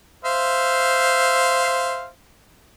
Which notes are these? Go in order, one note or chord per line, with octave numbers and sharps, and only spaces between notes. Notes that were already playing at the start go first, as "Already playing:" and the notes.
C5 E5 F5